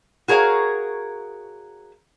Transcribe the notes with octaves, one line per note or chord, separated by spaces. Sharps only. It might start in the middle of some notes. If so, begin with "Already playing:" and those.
F#4 G#4 A#4 C#5 F5